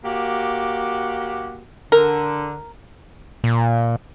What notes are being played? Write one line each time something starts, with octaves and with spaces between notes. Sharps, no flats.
A#3 F#4 G4
D3 A#4
A#2